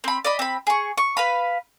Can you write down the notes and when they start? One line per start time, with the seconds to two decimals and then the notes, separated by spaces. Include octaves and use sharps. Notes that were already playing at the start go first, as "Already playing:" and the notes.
0.04 C4 B5
0.25 D5 D#5 B5
0.39 C4 B5
0.67 G#4 C#6
0.98 C#6
1.17 B4 F5 B5